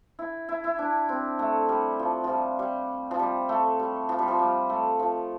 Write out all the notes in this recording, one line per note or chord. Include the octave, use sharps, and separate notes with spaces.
E4
E4
E4
D4
C4
A3
G3
F3
F3
G3
G3
F3
G3
A3
G3
F3
G3
F3
G3
A3
F3